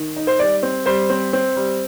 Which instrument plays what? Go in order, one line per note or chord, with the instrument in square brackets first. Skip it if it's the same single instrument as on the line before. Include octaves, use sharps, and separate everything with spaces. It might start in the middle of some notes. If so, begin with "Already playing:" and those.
Already playing: [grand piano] D#3
D#4
[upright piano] C5
[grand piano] G3 [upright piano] D5
[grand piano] C4
[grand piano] G3 [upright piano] C5
[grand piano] C4
C4
G3